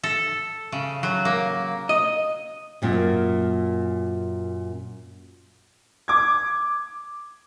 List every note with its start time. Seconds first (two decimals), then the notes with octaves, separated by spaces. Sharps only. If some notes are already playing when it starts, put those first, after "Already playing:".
0.03 A4
0.72 C#3
1.03 F#3
1.25 A#3
1.89 D#5
2.82 F#2 A#2 A#3
6.08 D6 G#6